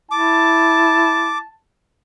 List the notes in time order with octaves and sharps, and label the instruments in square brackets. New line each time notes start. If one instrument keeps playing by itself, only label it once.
[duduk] E4 [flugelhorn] A5 [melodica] D6